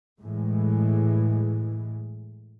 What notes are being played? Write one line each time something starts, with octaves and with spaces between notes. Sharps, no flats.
A2 E3 G#3